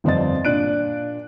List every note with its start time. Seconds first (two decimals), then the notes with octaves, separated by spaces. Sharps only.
0.04 G1 F2 C4 D5 D#5 A6
0.45 A#2 D4 F#6 D7